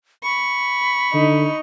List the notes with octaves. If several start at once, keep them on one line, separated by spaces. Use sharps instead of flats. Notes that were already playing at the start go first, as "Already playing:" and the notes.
B5 C#6
D3 D#4